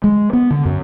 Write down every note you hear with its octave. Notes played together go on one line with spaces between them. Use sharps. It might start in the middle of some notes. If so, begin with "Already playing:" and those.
G#3
B3
D3
F#2